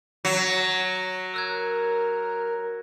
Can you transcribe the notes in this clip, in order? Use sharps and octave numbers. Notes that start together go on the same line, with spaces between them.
F#3 A#6 C#7
A#4 E6 F#6 G#6